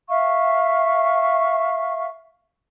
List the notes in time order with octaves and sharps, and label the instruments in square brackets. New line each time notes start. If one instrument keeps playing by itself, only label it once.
[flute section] E5 F5 C#6